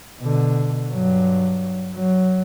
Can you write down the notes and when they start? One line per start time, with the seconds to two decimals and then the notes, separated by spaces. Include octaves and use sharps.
0.20 B2 D3
0.88 G2 F#3
1.93 F#3